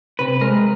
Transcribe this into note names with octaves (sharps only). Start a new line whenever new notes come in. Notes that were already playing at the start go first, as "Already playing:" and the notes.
C3 B4
G#3 A#4